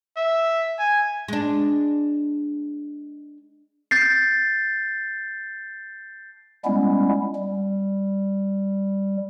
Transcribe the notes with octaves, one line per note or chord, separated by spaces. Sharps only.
E5
G#5
G#3 D4
G6 A6 C7
G3 G#3 B3 C#4 E4
G3